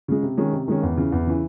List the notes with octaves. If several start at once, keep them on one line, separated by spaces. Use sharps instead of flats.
C#3 G#3
C3
D#3 G#3 C#4
C3
D#3 G#3 C#4
E2
C#3 E3
E2
C#3 E3